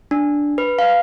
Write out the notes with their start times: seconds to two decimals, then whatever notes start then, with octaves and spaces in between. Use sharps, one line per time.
0.11 D4
0.58 B4
0.79 F5